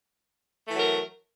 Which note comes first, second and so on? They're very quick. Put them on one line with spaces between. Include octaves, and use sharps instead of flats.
A3 E3 F#3 A#4